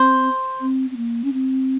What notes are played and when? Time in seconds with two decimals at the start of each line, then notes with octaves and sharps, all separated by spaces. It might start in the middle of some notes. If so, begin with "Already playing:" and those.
Already playing: C4 C5
0.61 C4
0.91 C4
0.96 A#3
1.24 C#4
1.33 C4